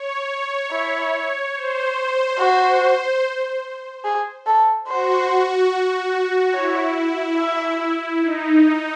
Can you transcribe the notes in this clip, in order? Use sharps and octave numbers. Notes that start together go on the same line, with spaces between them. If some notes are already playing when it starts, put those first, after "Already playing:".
Already playing: C#5
E4
C5
F#4
G#4
A4
F#4 C5
E4 C#5
E5
D#4